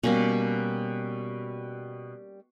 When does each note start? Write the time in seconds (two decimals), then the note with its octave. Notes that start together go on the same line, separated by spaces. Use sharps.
0.03 B2 G3 A#3 C#4